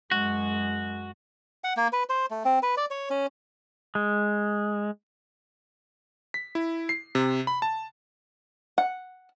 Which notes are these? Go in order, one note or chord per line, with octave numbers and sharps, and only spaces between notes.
F#2 G#3 F#4
F#5
A#3
B4
C5
A3
C4
B4
D5
C#5
C#4
G#3
B6
E4
C7
C3
B5
A5
F#5